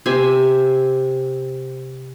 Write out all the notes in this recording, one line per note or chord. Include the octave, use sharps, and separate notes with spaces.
C3 C5 E5 G#5